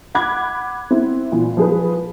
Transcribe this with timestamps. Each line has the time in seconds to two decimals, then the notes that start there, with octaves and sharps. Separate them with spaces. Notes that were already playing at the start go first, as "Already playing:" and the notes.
0.15 F#5 B5 D6 F#6 G#6
0.91 C4 E4
1.32 A#2 E3 F4
1.57 F3 G#4 B4